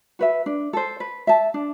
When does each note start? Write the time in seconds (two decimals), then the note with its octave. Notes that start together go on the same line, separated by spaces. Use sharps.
0.19 F#4 B4 E5
0.46 D4
0.73 A4 C5
1.00 B4
1.27 E5 A5
1.54 D4